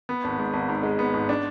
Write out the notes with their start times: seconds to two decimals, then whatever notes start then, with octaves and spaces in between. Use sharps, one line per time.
0.09 B3
0.24 G#1
0.39 G#2
0.53 G#1
0.69 G#2
0.83 G#3
0.99 B3
1.14 G#2
1.29 D4